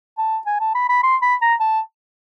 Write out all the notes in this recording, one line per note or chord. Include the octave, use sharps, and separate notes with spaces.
A5
G#5
A5
B5
B5
C6
B5
A#5
A5